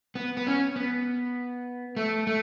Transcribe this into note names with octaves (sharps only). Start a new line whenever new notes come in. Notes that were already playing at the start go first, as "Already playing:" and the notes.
B3
B3
C#4
B3
A3
A3